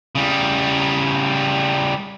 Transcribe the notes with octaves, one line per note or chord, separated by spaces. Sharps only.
C#3 G3